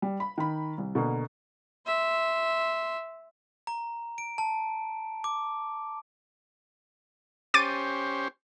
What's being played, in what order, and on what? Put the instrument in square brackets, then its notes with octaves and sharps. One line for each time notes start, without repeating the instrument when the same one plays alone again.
[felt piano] G3
B5
D#3 B5
C2
B2 D3 A#3
[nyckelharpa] E5 C6
[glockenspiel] A#5
D7
A5
D6
[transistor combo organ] C#4 G4 C5 [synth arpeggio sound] D6 A6 D#7